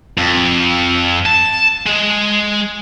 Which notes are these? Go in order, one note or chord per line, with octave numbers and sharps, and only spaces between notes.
F2
A5
G#3